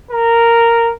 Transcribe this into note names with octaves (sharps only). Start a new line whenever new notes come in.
A#4